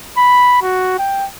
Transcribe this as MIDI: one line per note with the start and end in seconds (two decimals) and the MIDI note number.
0.18 0.61 83
0.62 0.98 66
0.99 1.26 79